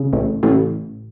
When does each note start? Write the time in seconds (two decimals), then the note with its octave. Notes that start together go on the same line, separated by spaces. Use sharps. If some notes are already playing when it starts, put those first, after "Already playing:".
Already playing: C#3
0.13 A1
0.43 A1